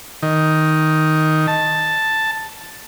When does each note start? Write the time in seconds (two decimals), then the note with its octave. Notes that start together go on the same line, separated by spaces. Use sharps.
0.23 D#3
1.47 A5